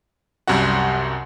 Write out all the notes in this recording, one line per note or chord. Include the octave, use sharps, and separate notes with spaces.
C2 F#2 G3 F#4 F#5